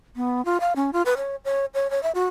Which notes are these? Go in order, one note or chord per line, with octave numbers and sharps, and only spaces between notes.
B3
F4
F5
C#4
F4
B4
C#5
C#5
C#5
C#5
E5
F#4